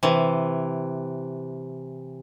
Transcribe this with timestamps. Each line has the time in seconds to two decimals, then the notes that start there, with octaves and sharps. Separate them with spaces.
0.03 C3 E3